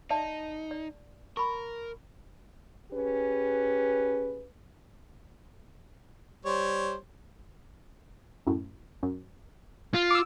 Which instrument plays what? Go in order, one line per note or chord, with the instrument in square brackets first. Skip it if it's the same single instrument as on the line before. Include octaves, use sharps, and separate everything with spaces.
[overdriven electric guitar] D#4 [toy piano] D5 E5 A5
[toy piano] D5
[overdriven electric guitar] A#4 [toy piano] B5 C#6
[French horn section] C#4 G4 G#4 B4
[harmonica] G3 C5 C#5
[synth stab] F#2 A2
F#2
[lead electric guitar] F4
[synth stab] D6 E6